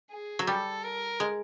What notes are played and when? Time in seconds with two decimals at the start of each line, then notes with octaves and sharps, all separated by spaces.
0.11 G#4
0.39 F#3
0.47 G3 A4
0.84 A#4
1.20 G#3